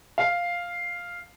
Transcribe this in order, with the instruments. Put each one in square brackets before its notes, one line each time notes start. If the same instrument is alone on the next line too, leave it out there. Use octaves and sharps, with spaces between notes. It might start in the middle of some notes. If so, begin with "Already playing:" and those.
[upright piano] F5